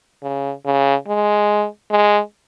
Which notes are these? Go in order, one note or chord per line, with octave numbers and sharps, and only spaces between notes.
C#3
C#3
G#3
G#3